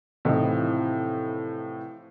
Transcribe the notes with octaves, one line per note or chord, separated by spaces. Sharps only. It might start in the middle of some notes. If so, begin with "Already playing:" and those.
A2 C3 E3 F3 C4 D#4